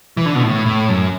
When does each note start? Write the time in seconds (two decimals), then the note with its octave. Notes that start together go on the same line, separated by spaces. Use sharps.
0.17 E3
0.26 D3
0.35 B2
0.43 A2
0.66 A2
0.88 F#2